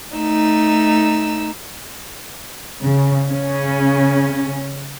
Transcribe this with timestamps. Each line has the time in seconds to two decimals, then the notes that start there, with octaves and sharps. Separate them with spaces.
0.15 A3 D#4 E6
2.82 C#3
3.31 C#3 C#4